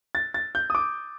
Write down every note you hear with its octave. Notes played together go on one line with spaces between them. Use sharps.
A6
A6
G6
D#6
D6